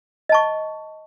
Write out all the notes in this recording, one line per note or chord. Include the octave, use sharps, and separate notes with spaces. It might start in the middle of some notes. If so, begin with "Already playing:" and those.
D#5 A5 C#6